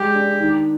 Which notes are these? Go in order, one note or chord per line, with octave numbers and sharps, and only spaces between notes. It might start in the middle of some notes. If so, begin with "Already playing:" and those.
Already playing: G3 G#3 G4
D4
D#3